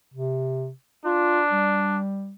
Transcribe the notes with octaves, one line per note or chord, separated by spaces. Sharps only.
C3
D4 F4
G3